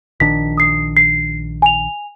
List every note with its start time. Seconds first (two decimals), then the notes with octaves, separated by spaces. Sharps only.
0.20 A#1 D#3 D4 B6
0.57 D#6 C7
0.97 C7
1.62 G#5 F7